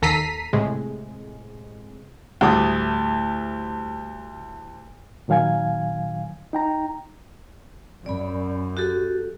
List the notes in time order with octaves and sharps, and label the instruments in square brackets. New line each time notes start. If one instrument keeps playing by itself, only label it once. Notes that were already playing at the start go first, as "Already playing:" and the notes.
[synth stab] D#2 A4 A#5 B6 C7 D#7
A2 C3 G#3
[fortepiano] D2 A2 G3 A3 D6 D#6
[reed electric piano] A#2 D#3 F#3 F5 G#5 G#6
D#4 G5 A#5
[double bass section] F#2 [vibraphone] D5 B5
[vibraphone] F#4 G4 A4